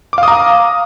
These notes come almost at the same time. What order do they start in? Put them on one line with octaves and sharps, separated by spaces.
D6 F5 D#6 A#5